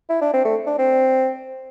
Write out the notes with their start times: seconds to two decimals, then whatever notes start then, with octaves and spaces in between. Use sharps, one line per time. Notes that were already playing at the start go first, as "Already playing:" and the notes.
0.10 E4
0.21 D4
0.33 C4
0.45 A3
0.67 D4
0.79 C4